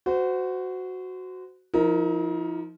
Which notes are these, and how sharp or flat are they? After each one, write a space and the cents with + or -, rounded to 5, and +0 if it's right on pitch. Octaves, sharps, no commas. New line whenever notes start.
F#4 +0 C5 -30
F3 -15 D#4 +40 A#4 +0